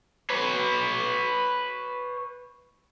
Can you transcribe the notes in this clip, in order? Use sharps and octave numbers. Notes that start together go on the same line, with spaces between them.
B4 C#5